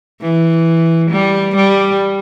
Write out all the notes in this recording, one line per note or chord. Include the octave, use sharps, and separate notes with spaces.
E3
G3
G3